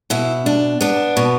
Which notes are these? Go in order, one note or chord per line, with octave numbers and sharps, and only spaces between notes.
B2 E4
D4
B3 D4
B2